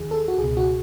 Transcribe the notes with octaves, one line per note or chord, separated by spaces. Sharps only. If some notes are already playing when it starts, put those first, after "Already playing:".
Already playing: D#2 D#3 G#4
A4
F#4
C#2 B2 G#4
F#4